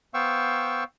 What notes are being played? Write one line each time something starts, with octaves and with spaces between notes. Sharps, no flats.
B3 C5 F5 G5 C#6 E6